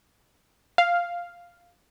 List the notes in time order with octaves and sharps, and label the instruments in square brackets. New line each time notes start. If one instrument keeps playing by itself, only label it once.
[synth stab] F5